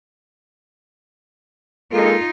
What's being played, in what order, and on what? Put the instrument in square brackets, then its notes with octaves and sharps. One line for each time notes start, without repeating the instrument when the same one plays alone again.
[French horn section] G#3 A#3 A4 [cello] D#4 F4